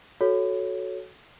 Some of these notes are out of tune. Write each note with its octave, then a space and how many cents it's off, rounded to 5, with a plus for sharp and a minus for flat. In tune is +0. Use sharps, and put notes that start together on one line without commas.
F#4 +0 A4 -20 C#5 +0